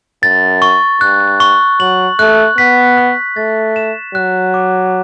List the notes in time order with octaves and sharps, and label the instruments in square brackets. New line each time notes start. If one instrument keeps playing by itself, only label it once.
[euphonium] F#2 [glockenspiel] A6
[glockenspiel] C#6
[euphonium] G2 [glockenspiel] F#6
[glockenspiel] C#6
[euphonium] F#3 [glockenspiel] F#7
[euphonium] A3 [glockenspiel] F#6
[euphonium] B3 [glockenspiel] B6
[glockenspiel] F#6
[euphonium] A3 [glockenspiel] A6
[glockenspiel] E7
[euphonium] F#3 [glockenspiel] F#6
[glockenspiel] D6